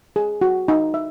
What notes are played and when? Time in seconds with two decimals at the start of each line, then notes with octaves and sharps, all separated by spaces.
0.16 G#4
0.41 F#4
0.68 D#4
0.94 E5